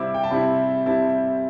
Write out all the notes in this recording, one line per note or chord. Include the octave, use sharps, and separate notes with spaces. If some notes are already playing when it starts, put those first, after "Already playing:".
Already playing: C3 G3 C4 E4 D6 E6
G5
A5
C3 G3 C4 E4 B5
C3 G3 C4 E4 A5